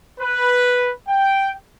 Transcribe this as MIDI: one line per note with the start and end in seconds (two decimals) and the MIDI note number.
0.20 0.90 71
1.08 1.53 79